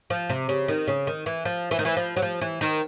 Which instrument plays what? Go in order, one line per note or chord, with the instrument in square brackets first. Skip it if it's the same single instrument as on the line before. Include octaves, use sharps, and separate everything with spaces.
[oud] F3
C3
C#3
D#3
C#3
D#3
E3
F3
E3
D#3
E3
F3
F#3
F3
E3
D#3